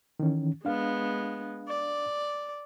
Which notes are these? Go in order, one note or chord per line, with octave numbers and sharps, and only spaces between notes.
D#3 E3 C#4
G#3 B3 D4 F5
D5